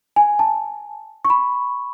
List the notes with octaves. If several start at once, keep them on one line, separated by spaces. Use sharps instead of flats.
G#5
A5
C#6
B5